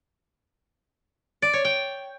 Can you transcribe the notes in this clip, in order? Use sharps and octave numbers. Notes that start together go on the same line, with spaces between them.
D5
C#5
G5